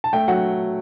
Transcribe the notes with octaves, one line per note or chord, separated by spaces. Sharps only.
A5
A3 G5
F#3 F#5